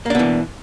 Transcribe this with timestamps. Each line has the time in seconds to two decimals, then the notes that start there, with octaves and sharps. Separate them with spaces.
0.06 A#3
0.10 D4
0.15 B2
0.19 E3